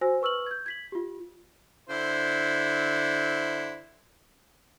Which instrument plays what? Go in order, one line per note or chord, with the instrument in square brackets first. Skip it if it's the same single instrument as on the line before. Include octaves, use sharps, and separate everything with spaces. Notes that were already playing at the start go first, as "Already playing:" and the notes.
[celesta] F#4 C5 G#5 E6 A#6
B4 C#6 E6 F6 F#7
G6 G#6
G#6 B6 F#7
F4 G4
[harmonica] D3 E4 C5